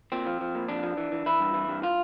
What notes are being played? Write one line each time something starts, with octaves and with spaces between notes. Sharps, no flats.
A#2 C4
F3
F3
A#2
F2 D4
F3
E3
E3
E3 E4
G2
E3
G2
F4